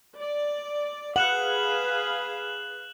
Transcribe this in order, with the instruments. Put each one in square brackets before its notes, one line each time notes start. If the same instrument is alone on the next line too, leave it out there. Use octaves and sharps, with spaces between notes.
[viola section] D5
[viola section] G#4 B4 F5 [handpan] F#5 [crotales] F#6 E7 F#7